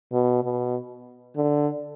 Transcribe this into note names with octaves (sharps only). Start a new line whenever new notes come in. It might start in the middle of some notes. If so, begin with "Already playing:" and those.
B2
B2
D3